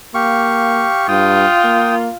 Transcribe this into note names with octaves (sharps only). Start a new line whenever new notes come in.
A#3 G4 F5 C#6
G2 F4 G5 D#6
A#3